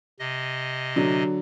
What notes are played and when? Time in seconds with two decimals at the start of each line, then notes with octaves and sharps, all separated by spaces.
0.20 C3 D#5
0.96 D3 F#3